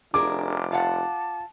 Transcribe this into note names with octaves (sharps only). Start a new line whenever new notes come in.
F1 D4 G#4 A#4 D6
F4 F5 F#5 A5